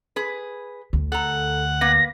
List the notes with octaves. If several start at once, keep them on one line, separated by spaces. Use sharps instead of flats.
G#4 B4
D2
A4 F#5 A#5
A#3 B4 A#6